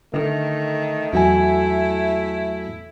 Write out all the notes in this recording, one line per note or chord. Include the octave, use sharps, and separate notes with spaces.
D3 D#3 A3
E2 F#3 E4 F#4 G#5